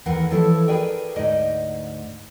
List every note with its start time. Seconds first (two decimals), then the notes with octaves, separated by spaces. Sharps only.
0.06 D#2 E3 A#4 F#5 G5
0.30 E3 F3 E4 A4 C#5
0.68 G#4 A#4 B4 D5 E5 G5
1.15 D2 G#2 D#4 D5 D#5